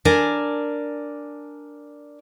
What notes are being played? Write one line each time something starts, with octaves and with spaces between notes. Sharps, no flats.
D4 A#4 G#5